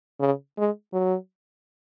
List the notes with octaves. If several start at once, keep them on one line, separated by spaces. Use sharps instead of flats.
C#3
G#3
F#3